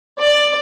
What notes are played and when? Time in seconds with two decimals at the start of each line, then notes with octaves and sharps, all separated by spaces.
0.20 D5